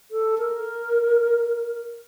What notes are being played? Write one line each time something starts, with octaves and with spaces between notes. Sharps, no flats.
A4
A#4